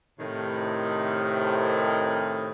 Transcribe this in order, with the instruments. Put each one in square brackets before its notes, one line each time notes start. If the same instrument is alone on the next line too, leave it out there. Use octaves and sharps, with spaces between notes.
[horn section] A2 C3 D#3